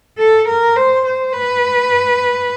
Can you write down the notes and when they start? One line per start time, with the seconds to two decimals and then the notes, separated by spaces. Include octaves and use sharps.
0.18 A4
0.47 A#4
0.76 C5
1.05 C5
1.33 B4